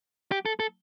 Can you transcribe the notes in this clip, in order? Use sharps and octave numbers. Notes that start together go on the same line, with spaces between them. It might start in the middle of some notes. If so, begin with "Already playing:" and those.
G4
A4
A4